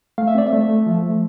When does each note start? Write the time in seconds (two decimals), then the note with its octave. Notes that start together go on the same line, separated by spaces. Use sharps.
0.18 A3 F5
0.28 E5
0.35 C4 D5
0.47 E5
0.53 A3
0.69 A3
0.86 F3
1.03 A3